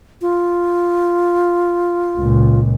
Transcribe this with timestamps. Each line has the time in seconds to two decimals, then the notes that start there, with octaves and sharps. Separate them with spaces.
0.21 F4
2.18 C#2 A#2